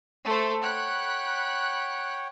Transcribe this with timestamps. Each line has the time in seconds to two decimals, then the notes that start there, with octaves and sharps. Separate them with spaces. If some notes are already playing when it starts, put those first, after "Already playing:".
0.25 A3 A4 C5
0.63 C#5 F#5 G5 B5 F#6